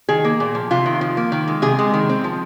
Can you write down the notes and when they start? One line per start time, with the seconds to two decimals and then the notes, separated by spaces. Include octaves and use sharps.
0.09 D#3 G#4
0.24 A#3
0.40 A#2
0.55 F3
0.71 C3 F4
0.86 D#3
1.01 F3
1.17 A#3
1.32 D#3
1.48 G#3
1.62 C3 G#4
1.79 G#3
1.94 D#3
2.09 C4
2.24 F3